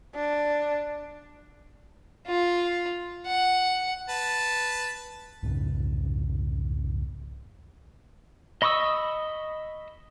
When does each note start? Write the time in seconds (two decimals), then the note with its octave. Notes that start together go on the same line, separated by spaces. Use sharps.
0.15 D4
2.26 F4
3.26 F#5
4.09 B4 A5
5.43 C2 F2 G#2 C#3
8.62 D#5 B5 C#6 D#6 E6